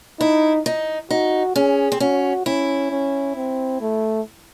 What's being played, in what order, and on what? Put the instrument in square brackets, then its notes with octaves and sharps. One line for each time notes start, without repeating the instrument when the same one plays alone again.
[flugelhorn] D#4 [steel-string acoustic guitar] E4
[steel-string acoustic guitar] D#4
[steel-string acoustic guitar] D#4 [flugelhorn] F#4
[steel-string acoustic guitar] C#4 [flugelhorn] G#4
[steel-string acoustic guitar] C4
[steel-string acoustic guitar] C#4 [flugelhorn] F#4
[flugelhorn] C#4 [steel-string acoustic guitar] E4
[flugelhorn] C#4
C4
A3